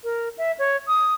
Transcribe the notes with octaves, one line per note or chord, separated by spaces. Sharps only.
A#4
E5
C#5
D#6